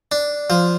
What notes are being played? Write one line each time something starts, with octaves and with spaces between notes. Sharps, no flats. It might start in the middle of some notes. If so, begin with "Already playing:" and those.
D4
F3